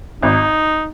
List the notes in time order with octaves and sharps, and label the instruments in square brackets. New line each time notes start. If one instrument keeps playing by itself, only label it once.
[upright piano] G#1 [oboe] D#4